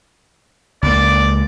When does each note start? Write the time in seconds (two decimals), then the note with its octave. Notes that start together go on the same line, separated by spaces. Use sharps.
0.83 C#2 A#3 D5